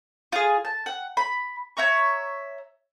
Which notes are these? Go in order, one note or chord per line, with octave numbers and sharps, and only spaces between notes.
F4 G#4
A5
F#5
B5
C#5 E5 A#5 C#6